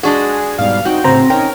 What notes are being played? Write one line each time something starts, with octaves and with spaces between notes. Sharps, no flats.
G#3 D4 F#4 G#4
G#2 B2 G3 F5
C4 D#4 F#4 G5
A2 C#3 C4 C5 A#5
C#4 D#4 A#4 G5